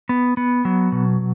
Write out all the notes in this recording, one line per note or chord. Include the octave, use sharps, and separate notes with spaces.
B3
B3
F#3
B2